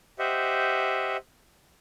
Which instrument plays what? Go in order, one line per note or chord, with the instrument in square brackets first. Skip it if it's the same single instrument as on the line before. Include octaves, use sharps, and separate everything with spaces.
[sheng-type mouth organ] G4 C5 D#5 E5 F#5